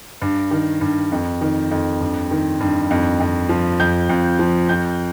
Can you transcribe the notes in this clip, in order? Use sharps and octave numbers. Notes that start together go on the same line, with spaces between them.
G2
D#3
G2
F2
D#3
F2
G2
D#3
G2
F2
F2
F3
F2 G6
F2
F3
F2 G6